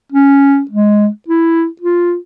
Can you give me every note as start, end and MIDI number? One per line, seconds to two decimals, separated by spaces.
0.12 0.63 61
0.71 1.08 56
1.28 1.66 64
1.81 2.16 65